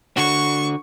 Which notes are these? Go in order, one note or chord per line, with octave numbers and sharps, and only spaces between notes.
D3 F#4 C#6